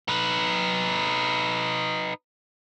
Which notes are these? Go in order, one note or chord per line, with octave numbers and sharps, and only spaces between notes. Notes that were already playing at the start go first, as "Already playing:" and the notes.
D#4 B4